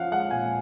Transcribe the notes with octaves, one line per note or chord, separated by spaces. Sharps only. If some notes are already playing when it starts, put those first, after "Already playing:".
Already playing: F3 C#4 F5 F#5
G#3 F#5
A#2 G#5